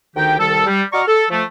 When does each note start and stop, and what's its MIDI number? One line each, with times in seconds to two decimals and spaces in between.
0.16 0.37 38
0.16 0.37 51
0.16 0.37 63
0.16 0.37 67
0.16 0.37 79
0.38 0.62 36
0.38 0.62 51
0.38 0.62 55
0.38 0.62 69
0.66 0.82 55
0.92 1.01 66
0.92 1.01 74
0.92 1.01 75
0.92 1.01 82
0.92 1.01 85
0.92 1.01 89
1.07 1.25 69
1.30 1.42 53
1.30 1.42 57